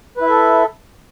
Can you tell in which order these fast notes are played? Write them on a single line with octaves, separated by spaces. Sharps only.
B4 E4 E5 A4